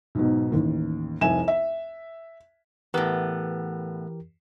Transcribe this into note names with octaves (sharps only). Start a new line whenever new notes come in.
B1 G#2 B2
A1 D#2
F1 C2 E5 G#5 E7
E5
A2 E3 B3 G4 A#4